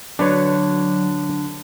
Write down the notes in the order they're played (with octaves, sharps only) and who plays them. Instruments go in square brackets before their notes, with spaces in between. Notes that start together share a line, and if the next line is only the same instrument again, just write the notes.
[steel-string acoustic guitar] D3 [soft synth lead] F#3 [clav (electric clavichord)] D4 B4 C#5